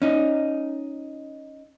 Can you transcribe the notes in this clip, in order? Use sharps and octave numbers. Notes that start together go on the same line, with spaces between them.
C#4 D#4